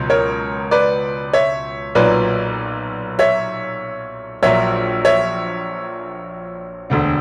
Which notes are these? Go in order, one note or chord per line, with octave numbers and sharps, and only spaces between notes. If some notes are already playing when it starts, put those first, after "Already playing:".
Already playing: C#2 B2 F#3
A#4 C#5
B4 D5
C#5 E5
B1 A#2 F#3 B4 D5
C#5 E5
A#1 A#2 F#3 C#5 E5
C#5 E5
E1 D2 D3